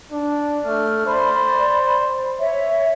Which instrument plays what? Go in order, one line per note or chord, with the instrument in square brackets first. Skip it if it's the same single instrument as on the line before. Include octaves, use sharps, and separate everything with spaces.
[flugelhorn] D4
[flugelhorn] A3 [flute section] F6
[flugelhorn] C5 [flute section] D5 B5
[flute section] C#5 E5